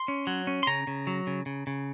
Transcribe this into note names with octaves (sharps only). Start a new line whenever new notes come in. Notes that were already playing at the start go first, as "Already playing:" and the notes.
Already playing: C6
C#4
F#3
C#4
C6
C#3 A#5
C#3
F#3
C#3
C#3
C#3